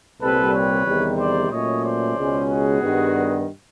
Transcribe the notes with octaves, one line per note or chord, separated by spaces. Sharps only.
C2 A#2 G3 C4 A4 B4
B4 C#5
E2 C3 D#3 G3
C5 D5
A#2 F#3 A3 C#4 C#5 D#5
C5 D5
C#2 B2 G#3 C#4
F#4 G#4
G2 D#3 G3 B3